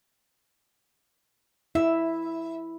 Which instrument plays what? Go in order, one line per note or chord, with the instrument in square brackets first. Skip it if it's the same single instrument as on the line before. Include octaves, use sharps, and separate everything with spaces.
[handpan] E4 [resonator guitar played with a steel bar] E5